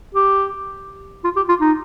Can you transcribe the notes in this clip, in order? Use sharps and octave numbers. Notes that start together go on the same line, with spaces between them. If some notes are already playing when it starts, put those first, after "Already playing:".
G4
F4
G4
F4
D#4